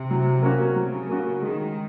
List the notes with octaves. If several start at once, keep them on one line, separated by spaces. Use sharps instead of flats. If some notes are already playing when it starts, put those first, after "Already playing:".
Already playing: C3
F#3
A#3 C#4 F#4
C#3 F#3
A#3 C#4 F#4
D#3 G#3